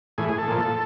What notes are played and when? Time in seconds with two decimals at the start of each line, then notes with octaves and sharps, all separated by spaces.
0.18 A2 E3 G#4
0.29 G#4
0.38 A4
0.48 A#2 F3